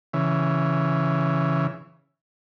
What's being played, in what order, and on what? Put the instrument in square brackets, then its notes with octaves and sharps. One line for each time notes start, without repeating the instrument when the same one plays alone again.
[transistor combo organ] C#3 E3